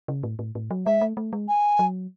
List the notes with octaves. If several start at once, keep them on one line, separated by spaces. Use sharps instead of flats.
C#3
A2
A2
A2
F#3
G#3 E5
A3
A3
G#3
G#5
F#3